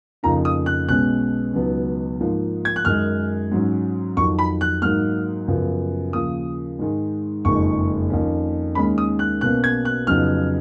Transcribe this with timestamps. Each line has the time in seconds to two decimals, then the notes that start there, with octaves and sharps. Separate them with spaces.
0.23 F2 C#3 F3 A#3 D#4 A#5
0.45 D#6
0.66 F#6
0.88 B1 B2 G#3 C#4 F#6
1.54 C#2 B2 F#3 B3 D#4
2.20 G#2 F3 A#3 D#4
2.65 G#6
2.76 F#6
2.85 F#2 D#3 G#3 D#4 F6
3.51 G#2 F#3 C#4
4.17 F2 D#3 F#3 C#6
4.39 B5
4.61 F#6
4.82 G#2 F#3 A#3 D#4 F6
5.48 F#2 C#3 F3 B3
6.13 D#2 C#3 F3 D#6
6.79 G#2 D#3 G#3
7.45 F#1 F2 D#3 G#3 D#4 C#6
8.10 F2 D#3 A#3 C#4
8.75 D#2 D#3 G#3 C#4 B5
8.98 D#6
9.19 F#6
9.41 B1 B2 A#3 C#4 F#6
9.64 G#6
9.85 F#6
10.07 F2 C#3 F#3 B3 D#4 F6